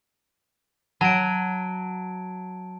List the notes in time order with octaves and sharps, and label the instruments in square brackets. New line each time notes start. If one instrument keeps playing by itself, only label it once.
[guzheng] F#3 [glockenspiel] A5 D7